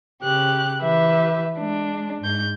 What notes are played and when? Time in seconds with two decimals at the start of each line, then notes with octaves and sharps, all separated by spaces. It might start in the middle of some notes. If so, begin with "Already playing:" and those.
0.22 C#3 G4 F#6
0.81 E3 G4 B4 E5
1.57 G#3 D4
2.21 G#2 G6